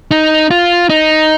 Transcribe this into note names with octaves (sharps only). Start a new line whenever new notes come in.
D#4
F4
D#4